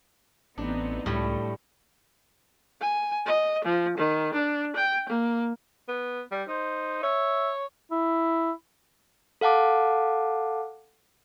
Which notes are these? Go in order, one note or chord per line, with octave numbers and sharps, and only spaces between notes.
A1 B3 C4 D4 D#4
C#2 A2 G3 A3
G#5
D#5
F3
D#3
D4
G5
A#3
B3
G3
D#4 C5
C#5 E5
E4
A4 F5 F#5 A5 D6